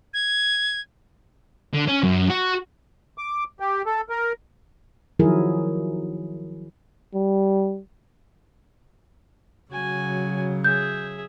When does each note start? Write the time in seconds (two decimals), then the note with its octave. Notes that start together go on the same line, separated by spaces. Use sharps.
0.14 G#6
1.73 D3
1.88 C#4
2.03 F#2
2.30 F#4
3.18 D6
3.60 G4
3.86 A4
4.09 A#4
5.19 D#3 F3 F#3 E4 G#4 A#4
7.14 G3
9.71 C#3 F#3 F#4 G#5
10.64 G#4 E5 G6